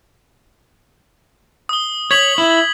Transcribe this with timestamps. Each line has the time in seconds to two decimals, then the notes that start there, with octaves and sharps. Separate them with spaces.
1.69 D#6 G7
2.11 C#5 G#6 B6 F#7
2.38 E4